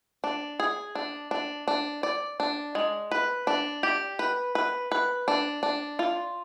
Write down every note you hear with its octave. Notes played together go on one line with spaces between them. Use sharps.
D4
G#4
D4
D4
D4
D5
D4
G#3
B4
D4
G4
B4
B4
B4
D4
D4
F4